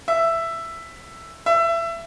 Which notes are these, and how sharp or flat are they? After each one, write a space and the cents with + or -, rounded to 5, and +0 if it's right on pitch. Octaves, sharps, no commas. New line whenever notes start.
E5 +10
E5 +25